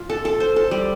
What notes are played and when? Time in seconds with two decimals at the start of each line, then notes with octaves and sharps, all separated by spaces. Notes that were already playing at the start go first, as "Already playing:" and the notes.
Already playing: F4
0.10 A4
0.25 A4
0.40 C5
0.56 A4
0.71 G3